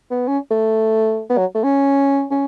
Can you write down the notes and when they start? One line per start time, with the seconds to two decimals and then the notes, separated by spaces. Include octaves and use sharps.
0.11 B3
0.28 C#4
0.51 A3
1.30 B3
1.38 F#3
1.55 A3
1.64 C#4
2.31 C#4